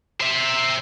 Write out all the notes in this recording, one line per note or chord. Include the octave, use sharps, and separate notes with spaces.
C5 E5